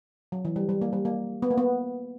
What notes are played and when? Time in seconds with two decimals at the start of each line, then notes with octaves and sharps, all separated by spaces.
0.32 F#3
0.45 E3
0.56 G3
0.69 G3
0.82 A#3
0.93 G3
1.05 A#3
1.42 B3
1.51 A#3
1.58 B3